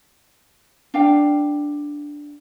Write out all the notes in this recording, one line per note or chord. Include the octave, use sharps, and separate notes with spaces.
D4 F5 G5